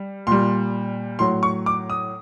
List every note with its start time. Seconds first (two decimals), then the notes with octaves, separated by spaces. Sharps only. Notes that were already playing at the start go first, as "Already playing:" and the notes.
Already playing: G3
0.27 A#2 G3 C6
1.19 A2 F#3 C6
1.43 C#6
1.66 D6
1.90 D#6